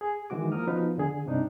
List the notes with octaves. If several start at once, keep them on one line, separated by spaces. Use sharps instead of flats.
G#4
D#3 E3 G#3 F#4 D6
F3 A#3 A#4 D#6 F6
F3 B3 D#4 F#4 B4
D3 G#4
G2 C3 G3 D4 D#4